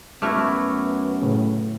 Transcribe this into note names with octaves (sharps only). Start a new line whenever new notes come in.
F#2 A3 B3 E4 F#4 D6 F6 G#6
A2 C#3